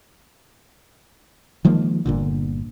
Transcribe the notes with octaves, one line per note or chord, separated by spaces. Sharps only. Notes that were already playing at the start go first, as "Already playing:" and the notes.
D#3 F3 G#3 A#3
G1 A#2 D3